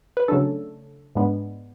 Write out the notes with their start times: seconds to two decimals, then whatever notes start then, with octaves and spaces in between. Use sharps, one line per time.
0.17 B4
0.28 C#3 F#3 A3 D4 A4
1.15 G#2 G#3 B3 D4